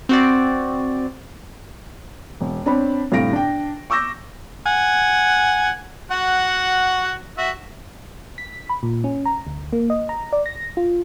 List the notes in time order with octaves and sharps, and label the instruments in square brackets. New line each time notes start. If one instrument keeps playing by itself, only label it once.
[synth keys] C4 F#4 D5
[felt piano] E1
C4 D4 C#5 B5
C2 A2 D3 F5 A#6 D7
D4 G5
C#6 D6 E6 G6 A#6
[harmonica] F#5 G#5
F#4 F#5
F#4 E5
[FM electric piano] B6
B5
A#2
C#4
A#5
D2
A#3
D#5
A#5
D5
A#6
F4